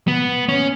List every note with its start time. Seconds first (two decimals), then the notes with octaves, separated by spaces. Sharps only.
0.08 B3
0.49 C#4